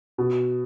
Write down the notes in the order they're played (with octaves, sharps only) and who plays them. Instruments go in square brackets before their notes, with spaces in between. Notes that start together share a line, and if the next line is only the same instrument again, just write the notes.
[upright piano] B2